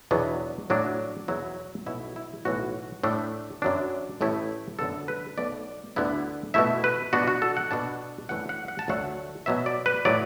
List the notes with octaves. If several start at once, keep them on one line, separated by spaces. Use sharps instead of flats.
E2 B2 F#3 B3 D4
A2 F#3 D4
E2 B2 F#3 B3 E4
B1 B2 B3 E4
E4
B1 A2 E3 F#4
A2 A3 D4
F#2 F#3 D4
A1 A2 A3 E4
F#2 D3 B3 D4 A4
B4
B1 B2 A3 D5
D2 D3 B3 E4
B2 A3 E4 E5
B4
B2 B3 D4 F#4
F#4
A4
F#5
B2 B3 D4 A5
F#2 E3 A3 D4 F#5
F#5
F#5
A5
D2 D3 F#3 A3 F#5
B2 F#3 B3 E5
D5
B4
A2 F#3 D5